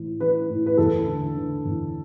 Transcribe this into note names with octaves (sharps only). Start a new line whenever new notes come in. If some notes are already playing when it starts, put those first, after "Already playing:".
Already playing: A2 E3
E3 B4
A2
B4
E2 A4
D3
D3
E2